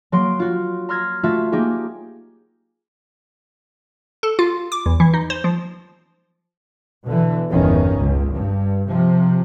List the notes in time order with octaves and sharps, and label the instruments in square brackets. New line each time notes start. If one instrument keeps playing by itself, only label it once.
[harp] F#3 A#3 C6 D7
F4 F#4
A#5 C6 E6 F6 G#6 A#6
A3 F4 F#4 E5
A#3 D#4 G4 G#4
[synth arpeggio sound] A4
F4
D6
E2
E3
D#4
C5
F3
[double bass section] B2 D3 E3
G1 E2 D#3 C#4
C#2
G2
C3 F3